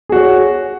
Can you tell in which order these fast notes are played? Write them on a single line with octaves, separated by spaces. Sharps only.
G#4 F#4 C#5